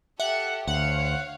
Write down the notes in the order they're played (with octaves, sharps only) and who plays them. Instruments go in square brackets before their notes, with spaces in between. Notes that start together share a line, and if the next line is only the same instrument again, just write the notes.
[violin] G4 A4 [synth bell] E5 [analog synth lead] F#5
[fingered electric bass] D2 [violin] C#5 F5 [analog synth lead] F#5